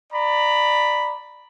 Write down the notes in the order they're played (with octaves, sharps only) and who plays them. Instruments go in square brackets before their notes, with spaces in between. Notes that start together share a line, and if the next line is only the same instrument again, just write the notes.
[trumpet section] D5 A#5 B5